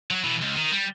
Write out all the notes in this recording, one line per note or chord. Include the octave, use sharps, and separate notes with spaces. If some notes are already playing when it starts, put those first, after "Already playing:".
F#3 F#4
B2 E3
C#2
D#3
G3